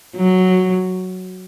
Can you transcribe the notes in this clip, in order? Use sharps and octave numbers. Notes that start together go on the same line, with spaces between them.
F#3